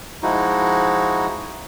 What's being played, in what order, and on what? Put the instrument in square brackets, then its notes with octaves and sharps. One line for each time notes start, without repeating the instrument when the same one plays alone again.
[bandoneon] F3 G#3 D#4 E4 F#4